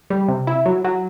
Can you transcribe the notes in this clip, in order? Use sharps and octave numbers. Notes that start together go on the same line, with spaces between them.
G3
C3
E4
F#3
F#3